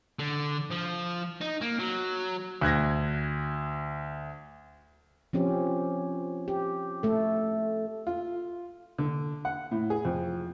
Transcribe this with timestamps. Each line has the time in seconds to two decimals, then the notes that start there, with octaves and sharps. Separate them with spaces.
0.19 D3
0.71 F3
1.41 D#4
1.61 A#3
1.79 F#3
2.61 D2 F#6 G#6 A#6
5.33 F3 C4 C#4 G4
6.48 G4
7.03 A3 A4
8.07 F4
8.98 D3
9.45 F#5
9.72 A2
9.90 G#4
10.05 F2